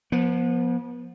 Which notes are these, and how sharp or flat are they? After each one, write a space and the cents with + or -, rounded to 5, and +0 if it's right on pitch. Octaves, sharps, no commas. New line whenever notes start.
F3 +10 B3 -35